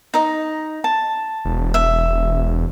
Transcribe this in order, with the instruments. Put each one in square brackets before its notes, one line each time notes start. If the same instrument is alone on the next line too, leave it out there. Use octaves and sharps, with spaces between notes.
[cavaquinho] D#4 D#5
A5
[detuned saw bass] E1
[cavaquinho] E5